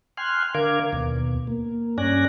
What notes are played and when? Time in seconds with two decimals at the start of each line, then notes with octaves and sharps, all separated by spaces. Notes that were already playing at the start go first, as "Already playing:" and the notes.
0.17 G5 G#5 C6 F6 F#6
0.55 D3 A#4 F5 D6 G#6
0.93 D#2 B2
1.47 A#3
1.98 G2 C#4 D5 G#5 F#6 A#6